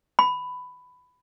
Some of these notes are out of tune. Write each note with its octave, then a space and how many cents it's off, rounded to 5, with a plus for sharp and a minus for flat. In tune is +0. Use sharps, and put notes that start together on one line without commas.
B5 +15